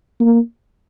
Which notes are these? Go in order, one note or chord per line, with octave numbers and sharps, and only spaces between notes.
A#3